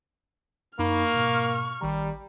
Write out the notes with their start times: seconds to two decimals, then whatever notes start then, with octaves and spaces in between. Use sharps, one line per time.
0.79 F#2 A#3 D#4 B5 C#6 F6
1.14 G#2 B2
1.81 A1 D#3 G3 A#5